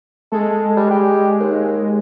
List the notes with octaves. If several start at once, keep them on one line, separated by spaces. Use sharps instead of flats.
G#3 A4
G3
G4
D#2